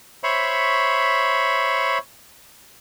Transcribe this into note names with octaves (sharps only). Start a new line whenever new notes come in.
C5 C#5 E5 B5 C#6